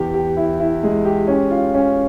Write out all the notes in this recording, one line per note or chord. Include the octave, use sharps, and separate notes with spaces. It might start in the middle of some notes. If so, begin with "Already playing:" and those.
Already playing: E2 G4
G4
E4
E4
G#3
G4
C#4
F4
C#4